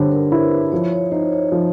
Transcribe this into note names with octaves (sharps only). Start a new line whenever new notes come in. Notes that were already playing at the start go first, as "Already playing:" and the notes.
Already playing: D3 G3 C5 C#5
A#4
E4 B4
C5
F3 C#5
C#5
D#4 C5
C#5
F3